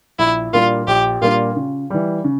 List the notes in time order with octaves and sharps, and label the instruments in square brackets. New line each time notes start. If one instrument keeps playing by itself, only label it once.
[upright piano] A#1 [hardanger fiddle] E4
[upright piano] A#2 G3 A#3 D4 [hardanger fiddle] F4
[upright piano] A#1 [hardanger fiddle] G4
[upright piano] A#2 G3 A#3 D4 [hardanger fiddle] F4
[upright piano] C#3
E3 G3
C#3